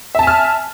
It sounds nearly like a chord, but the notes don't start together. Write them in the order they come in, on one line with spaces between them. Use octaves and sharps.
E5 A5 G#5 F6